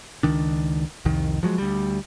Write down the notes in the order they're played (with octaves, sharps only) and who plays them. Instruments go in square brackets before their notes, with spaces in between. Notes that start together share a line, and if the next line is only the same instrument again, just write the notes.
[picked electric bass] C#2 D#3 D4
C2 F2 D#3
F3 F#3 G#3
D2 G3